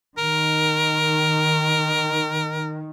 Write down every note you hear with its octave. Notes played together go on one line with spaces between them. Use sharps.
D#3 A#4